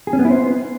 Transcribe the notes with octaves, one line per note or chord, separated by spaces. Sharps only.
G#4
C#4
B3
E4
C5